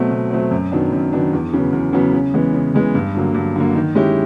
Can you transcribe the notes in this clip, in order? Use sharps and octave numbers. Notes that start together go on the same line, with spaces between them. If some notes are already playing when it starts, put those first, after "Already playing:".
Already playing: B2 F#3 A3 C4
B2
F#3 A3 C4
F#2
D#3 F#3 B3 D4
F#2
D#3 F#3 B3 D4
E2
C#3 F#3 B3
E2
C#3 F#3 B3
C#3
E3 G#3 B3
C#3
E3 G#3 B3
G2
D3 F#3 A#3
G2
D3 F#3 A#3
D#3
G#3 C#4 E4 G4